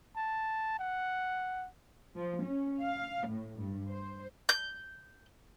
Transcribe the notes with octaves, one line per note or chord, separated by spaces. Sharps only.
A5
F#5
F3
C#4
F5
A2
G2
C5
G6